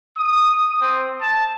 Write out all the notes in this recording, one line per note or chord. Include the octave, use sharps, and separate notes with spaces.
D#6
C4
A5